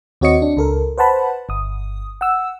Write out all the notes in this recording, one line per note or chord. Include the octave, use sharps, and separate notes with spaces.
D#2 C4 F#4 C#5 D#5 C#7
D4
C#2 A4 A#4
B4 C5 F#5 A5 B5
G1 D#6
F#5 E6